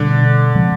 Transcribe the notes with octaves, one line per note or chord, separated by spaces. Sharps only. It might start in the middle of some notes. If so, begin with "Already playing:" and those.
Already playing: B2 D3 G3 B3 D4
C#3 F3 G#3 C4